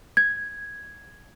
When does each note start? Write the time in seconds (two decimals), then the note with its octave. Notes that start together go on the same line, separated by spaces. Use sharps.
0.17 G#6